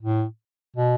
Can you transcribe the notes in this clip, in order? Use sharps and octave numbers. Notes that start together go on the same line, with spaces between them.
A2
B2